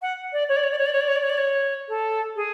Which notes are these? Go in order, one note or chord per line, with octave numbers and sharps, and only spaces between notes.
F#5
D5
C#5
D5
C#5
D5
C#5
D5
C#5
D5
C#5
D5
C#5
D5
C#5
A4
G#4